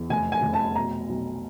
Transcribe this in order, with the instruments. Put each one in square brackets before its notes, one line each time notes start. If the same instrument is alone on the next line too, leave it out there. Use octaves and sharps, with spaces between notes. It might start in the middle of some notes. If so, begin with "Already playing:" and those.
Already playing: [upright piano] E2
F1 G#5
G#5
F1
A5
B2 A#5
B1